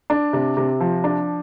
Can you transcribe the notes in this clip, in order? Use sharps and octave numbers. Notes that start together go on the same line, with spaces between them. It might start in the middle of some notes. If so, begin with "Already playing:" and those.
D4
C3
C3
F3
D4